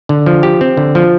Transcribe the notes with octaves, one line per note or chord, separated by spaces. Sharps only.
D3
F3
G4
C4
D3
F3